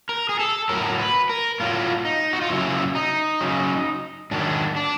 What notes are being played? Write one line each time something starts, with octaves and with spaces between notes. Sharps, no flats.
A#4
G#4
A4
A2 F#3 A#4
B4
A#4
A2 F#3 F4
D#4
F#4
F4
F#2 C#3 F#3 E4
D#4
F#2 C#3 F#3
G#2 D#3 F#3 D4
D4